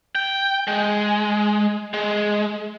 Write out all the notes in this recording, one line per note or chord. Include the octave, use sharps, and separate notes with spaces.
G5
G#3
G#3